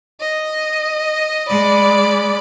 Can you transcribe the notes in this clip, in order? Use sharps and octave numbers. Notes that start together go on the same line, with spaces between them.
D#5
G#3 D5 B5